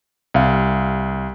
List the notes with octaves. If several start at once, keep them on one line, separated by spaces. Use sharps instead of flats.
C2 F5